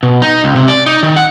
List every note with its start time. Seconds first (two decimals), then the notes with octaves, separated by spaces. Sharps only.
0.03 B2
0.22 D#4
0.44 C#2
0.56 C3
0.68 D5
0.86 D#4
1.03 D#3
1.16 F#5